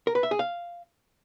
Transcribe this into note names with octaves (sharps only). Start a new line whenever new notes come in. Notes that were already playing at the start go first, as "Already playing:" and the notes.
A#4
B4
E5
G#4
F5